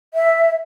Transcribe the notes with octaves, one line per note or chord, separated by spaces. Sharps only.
E5